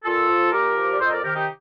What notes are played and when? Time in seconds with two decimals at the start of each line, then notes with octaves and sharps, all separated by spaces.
0.04 A#2 F4 A4
0.28 F3
0.51 A#2 G4 A#4
0.76 F3
0.93 D5
0.98 F2 A4 C5
1.06 D#5
1.10 A#4 D5
1.22 C3 D#3 G4 A#4
1.34 D#4 G4